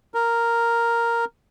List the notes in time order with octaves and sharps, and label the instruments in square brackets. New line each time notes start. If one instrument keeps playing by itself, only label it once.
[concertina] A#4